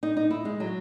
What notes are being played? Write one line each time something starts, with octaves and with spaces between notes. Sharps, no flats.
D#4
D#4
E4
G#3
F#3